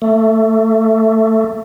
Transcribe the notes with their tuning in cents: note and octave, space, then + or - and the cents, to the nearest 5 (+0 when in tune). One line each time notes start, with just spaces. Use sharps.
A3 +15